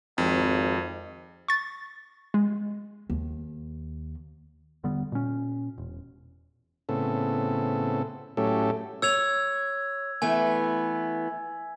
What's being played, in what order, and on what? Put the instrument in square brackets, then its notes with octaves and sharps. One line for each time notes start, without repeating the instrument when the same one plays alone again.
[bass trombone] G#1 [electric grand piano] F2
[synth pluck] C#6 A6
G#3
[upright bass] D#2
[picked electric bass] E1 D3 G3 B3
A#2 C#4
E1
[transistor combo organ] A2 C#3 B3 C4 A4
A2 F#3 A3 C#4 G4 A4
[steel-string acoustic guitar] C#5 [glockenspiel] E6 G#6 F7
[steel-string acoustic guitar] E3 A3 B3 [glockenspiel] G#5